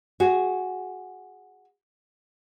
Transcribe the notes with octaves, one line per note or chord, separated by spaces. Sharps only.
F#4 G#4